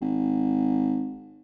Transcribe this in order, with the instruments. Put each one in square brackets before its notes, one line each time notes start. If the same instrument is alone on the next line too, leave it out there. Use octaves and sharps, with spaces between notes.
[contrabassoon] G#1